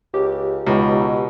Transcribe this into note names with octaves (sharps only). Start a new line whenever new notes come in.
C#2 G4
C#2 B2 D#4